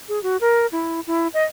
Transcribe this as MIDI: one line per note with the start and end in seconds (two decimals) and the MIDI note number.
0.09 0.22 68
0.23 0.37 66
0.41 0.67 70
0.72 1.00 64
1.07 1.28 64
1.34 1.44 75